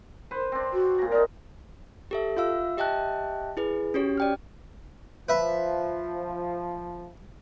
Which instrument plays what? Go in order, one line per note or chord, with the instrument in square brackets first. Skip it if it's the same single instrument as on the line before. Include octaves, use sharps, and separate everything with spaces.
[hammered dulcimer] B4 C5
C4 D4
[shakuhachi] F#4
[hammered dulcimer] A#2 A#5
[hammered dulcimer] D#4 A#4 [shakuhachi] D5
[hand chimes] G4 A4 E5
F4 E5 F5 E6
G4 D#5 E5 G5 A5 F#6
E4 G#4 B4
C#4 F#4 G4 C#5
D5 G5 F6
[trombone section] F3 [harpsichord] B4 E5